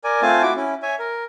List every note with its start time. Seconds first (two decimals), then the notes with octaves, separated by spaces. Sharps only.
0.04 A#4 D5 G#5
0.22 A3 C4 F4 G#5 A5
0.43 E4 F#4 D6
0.56 C#4 E4
0.82 C#5 E5 G#5
0.99 A#4